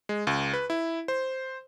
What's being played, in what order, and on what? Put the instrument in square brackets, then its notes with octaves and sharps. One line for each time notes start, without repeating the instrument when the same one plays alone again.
[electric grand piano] G#3
C#2
B4
E4
C5